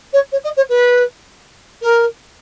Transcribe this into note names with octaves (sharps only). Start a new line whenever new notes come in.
C#5
C#5
D#5
C#5
B4
A#4